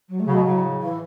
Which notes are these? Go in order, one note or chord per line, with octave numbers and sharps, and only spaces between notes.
F#3
A3
C#3 F#3
B2
A2 C#3 F#3
E3